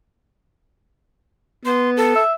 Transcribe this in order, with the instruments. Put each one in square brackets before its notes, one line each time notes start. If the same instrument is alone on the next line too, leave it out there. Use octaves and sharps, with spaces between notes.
[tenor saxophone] B3 [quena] C6
[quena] A4
[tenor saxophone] E5